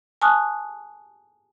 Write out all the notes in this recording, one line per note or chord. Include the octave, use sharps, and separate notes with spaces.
G#5 A5 C#6 D#6 F6 F#6